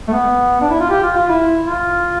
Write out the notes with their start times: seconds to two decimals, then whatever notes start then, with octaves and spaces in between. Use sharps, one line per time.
0.08 A3
0.13 B3
0.61 D4
0.70 E4
0.80 F4
0.90 G4
1.03 F4
1.16 F4
1.29 E4
1.66 F4